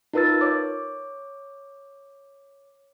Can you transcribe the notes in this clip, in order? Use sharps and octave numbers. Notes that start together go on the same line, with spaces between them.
D#4 F4 A#4 B4 E6 A6
C#5 D6